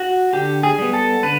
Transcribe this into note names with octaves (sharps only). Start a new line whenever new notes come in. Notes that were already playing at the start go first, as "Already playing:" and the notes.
Already playing: F#4
D3 G4
G#4
G3 B3
A4
D3 B4